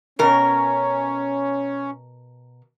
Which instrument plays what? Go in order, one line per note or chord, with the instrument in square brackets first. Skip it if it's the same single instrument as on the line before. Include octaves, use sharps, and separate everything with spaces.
[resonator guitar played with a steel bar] B2 A#4 [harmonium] C#4